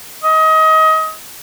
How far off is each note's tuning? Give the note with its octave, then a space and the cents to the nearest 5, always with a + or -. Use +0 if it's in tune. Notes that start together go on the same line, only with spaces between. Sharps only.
D#5 +25